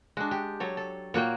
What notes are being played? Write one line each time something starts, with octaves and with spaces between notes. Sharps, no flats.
G#3 D4 F#4
G4
F#3 A4 C#5
A4
A#2 A#3 F#4 C#5 G5